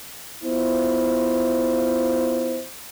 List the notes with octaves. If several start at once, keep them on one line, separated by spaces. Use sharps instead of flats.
B3 E4 F4 C5